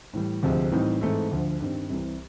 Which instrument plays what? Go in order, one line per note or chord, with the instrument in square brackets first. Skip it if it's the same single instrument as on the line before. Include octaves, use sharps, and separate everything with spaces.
[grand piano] A2 E3 G3
D2 C3 F3 G#3 C4
A2 E3 G3 C4 D#4
G#2 E3 A3 C4 E4
D2 D3 F3
G2 D#3 G3 C4
C2 C3 E3